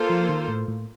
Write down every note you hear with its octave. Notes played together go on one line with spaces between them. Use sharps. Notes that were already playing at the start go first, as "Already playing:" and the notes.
Already playing: A#3 F4 A4 C5
F3
D#3
A2
A2